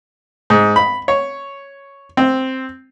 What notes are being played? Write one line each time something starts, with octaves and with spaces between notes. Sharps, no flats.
G#2
B5
C#5
C4